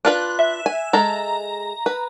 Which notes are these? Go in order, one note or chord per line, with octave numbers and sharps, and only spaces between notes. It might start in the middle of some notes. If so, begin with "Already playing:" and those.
D4 F4 B4 F#6
E5
G#5
G#3 A4 A#5
B4